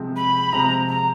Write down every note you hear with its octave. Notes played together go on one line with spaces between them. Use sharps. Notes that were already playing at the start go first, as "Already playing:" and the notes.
Already playing: C3 F3 G#3 C4
B5
C3 F3 G#3 C4 A#5
A#5